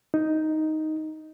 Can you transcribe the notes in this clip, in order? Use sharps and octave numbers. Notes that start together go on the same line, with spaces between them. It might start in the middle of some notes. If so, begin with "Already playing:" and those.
D#4